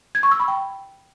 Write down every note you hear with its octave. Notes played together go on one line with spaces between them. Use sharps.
G#6
C#6
E6
B5
G5